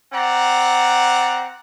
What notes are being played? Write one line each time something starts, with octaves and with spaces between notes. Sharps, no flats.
C4 D5 F#5 A#5